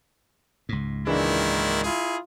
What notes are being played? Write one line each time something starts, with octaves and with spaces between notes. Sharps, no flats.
C#2 G#2
A#2 D#3 E3 G#3 D4 E4
E4 F4 G#4